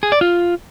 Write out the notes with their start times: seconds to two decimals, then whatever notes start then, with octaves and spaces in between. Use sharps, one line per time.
0.03 G#4
0.12 D5
0.21 F4